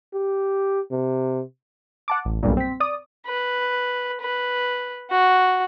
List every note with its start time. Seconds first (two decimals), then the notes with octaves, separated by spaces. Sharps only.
0.14 G4
0.91 C3
2.08 F#5 A5 D6
2.25 A1
2.43 B1 G2 A#2
2.57 C4 B6
2.80 D5 D#6
3.26 B4
4.21 B4
5.11 F#4